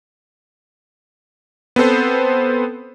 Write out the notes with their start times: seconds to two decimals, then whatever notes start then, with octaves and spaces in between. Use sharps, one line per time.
1.76 B3 C4 A4 C5